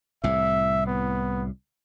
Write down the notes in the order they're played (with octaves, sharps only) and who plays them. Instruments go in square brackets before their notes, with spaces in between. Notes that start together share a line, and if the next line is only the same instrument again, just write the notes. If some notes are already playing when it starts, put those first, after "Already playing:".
[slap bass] C2 A2 [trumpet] E5
[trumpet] B3